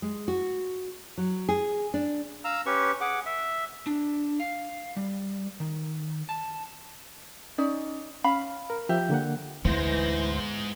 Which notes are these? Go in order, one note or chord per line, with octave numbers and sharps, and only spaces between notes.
G#3
F#4
F#3
G#4
D4
F5 A#5 E6
C#4 G4 B4 C#6
G#4 F#5 D6
E5
D4
F5
G3
D#3
A5
C#4 D#4 D5
C#4 F5 B5
A#4
F3 G4 E5
D3 A#3 F#5
D2 G#2 E3 G#3 B3 C5 A#6